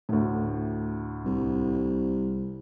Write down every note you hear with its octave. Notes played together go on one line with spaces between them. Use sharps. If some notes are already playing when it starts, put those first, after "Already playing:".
D2 A2
C2